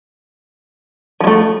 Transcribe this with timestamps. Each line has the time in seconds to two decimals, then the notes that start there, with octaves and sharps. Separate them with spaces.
1.21 F3
1.24 G#3
1.27 A3